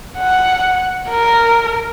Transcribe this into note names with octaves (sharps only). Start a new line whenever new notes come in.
F#5
A#4